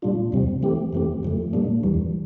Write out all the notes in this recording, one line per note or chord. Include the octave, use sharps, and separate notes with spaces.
A#2 G3 D4 F4
E2 C3 G3 C4
E3 A3 C4 G4
F2 E3 A3 C4 G4
F2 D3 F3 A3
A#2 G3 A#3 D4
E2 E3 G3